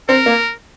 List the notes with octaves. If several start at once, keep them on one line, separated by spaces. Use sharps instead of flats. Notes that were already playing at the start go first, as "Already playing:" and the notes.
C4 A#4
A#3